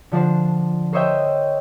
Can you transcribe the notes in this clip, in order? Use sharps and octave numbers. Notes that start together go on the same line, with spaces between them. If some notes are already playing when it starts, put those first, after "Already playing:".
D3 F3 D4 C5
A#4 C5 C#5 D#5 E5 G5